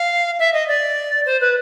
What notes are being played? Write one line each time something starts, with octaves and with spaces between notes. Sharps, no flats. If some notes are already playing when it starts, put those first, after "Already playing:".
Already playing: F5
E5
D#5
D5
C5
B4